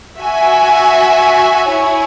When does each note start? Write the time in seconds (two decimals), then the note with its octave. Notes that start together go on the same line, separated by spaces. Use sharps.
0.19 F#4 E5 G#5
1.70 E4 C#5 G#5